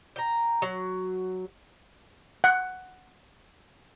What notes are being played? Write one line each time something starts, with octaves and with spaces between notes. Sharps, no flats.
G5 A#5
F#3
F#5